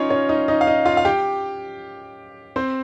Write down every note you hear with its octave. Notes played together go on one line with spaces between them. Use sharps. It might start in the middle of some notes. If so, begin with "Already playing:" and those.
Already playing: C#4 D#4 F4 C#5 D#5 F5
C#4 C#5
D#4 D#5
D#4 D#5
F5
D#4 D#5
F4 F5
F5
G4 G5
C4 C5